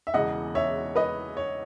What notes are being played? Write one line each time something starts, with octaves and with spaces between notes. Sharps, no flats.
E5
E1 E2 C#3 E3 D#5 F#5
C#5 E5
B4 D#5
C#5